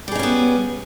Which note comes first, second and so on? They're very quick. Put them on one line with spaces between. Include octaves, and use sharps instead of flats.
G3 G#4 D#4 C#4 B3